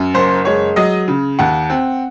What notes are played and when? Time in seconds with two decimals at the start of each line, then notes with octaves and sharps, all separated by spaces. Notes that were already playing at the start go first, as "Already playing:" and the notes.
Already playing: F#2
0.14 F#1 C5
0.45 G#3 C#5
0.76 F#3 D#5
1.08 C#3
1.39 D#2 F#5
1.70 C4